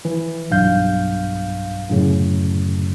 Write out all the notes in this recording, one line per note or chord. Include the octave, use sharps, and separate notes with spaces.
E3
B1 G2 F5 G6
F#2 A2 C#3